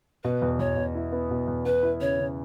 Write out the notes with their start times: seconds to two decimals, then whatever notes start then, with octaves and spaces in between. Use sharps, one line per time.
0.24 B2 B4
0.42 E2
0.59 E2 C#5
0.77 B2
0.95 E4
1.12 B3
1.31 B2
1.47 E2
1.65 B3 B4
1.83 E4
2.00 C#3 C#5
2.19 C#3